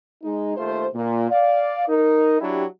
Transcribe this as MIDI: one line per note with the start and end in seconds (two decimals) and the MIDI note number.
0.24 0.57 56
0.24 0.57 63
0.57 0.86 39
0.57 0.86 57
0.57 0.86 65
0.57 0.86 72
0.95 1.27 46
1.31 1.84 74
1.31 1.84 77
1.88 2.40 63
1.88 2.40 70
2.41 2.64 54
2.41 2.64 62
2.41 2.64 64
2.41 2.64 67